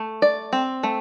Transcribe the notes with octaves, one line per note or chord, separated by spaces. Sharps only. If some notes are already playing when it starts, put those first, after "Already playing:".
Already playing: A3
D5
C4
A3